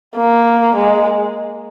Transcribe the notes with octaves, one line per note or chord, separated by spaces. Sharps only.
A#3
G#3